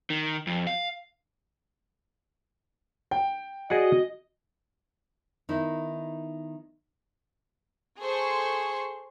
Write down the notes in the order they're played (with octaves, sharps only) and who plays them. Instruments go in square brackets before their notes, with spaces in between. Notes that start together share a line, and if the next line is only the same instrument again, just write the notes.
[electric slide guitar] D#3
F2
F5
[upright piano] G5
[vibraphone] F#4 [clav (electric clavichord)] G#4 D5 F#5 [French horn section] D#5
[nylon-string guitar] D#3 B3 D#4 E4
[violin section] G#4 A4 C5 C6 C#6